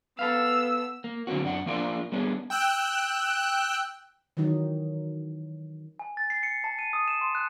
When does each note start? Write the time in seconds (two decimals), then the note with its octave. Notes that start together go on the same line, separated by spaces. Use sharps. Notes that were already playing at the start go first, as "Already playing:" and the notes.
0.19 B3 A4 B4 F5 E6
1.04 A#3
1.27 D3 F#3 A#3 C4 F#4
1.44 F#2 D4 F#5
1.66 F3 A#3 D4 F4 A#4 D5
2.12 G3 B3 C#4 D4 G#4
2.50 G5 E6 F#6
4.37 D#3 E3 F#3 D#4
5.99 G#5
6.17 A6
6.30 C7
6.43 C#7
6.64 A5
6.79 D#7
6.93 D#6
7.08 E7
7.21 C6
7.35 F#6